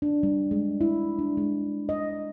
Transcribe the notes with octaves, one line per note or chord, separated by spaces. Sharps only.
D4
G3
G#3
E4
D4
G#3
D#5